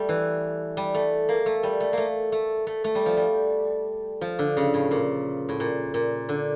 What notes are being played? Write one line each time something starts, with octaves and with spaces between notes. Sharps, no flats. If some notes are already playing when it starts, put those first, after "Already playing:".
Already playing: G3 A3
E3
G3
A3
A#3
A3
G3
A3
A3 A#3
A3
A3
A3
G3
F3
G3
F3
D3
C#3
A2
A#2
A2
A#2
A#2
D3